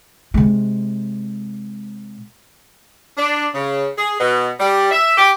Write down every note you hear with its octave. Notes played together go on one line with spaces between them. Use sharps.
C3 G#3
D4
C#3
G#4
B2
G3
E5
G4